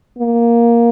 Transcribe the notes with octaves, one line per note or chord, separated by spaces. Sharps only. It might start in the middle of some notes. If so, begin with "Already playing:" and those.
A#3